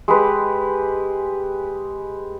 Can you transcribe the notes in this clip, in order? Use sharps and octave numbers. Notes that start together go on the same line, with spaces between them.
G#3 G4 B4